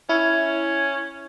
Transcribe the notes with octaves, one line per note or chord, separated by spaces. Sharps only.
C#4 E4